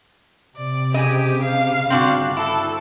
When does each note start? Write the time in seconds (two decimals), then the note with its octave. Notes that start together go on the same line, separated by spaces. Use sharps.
0.57 C3 D5
0.94 C#3 G4 D#5 G#5
1.43 F5
1.90 G1 C4 D4 F#4
2.37 E4 A4